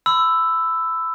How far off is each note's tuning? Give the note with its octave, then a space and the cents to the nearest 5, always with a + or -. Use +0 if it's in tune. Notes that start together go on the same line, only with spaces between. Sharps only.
B5 +30 E6 +0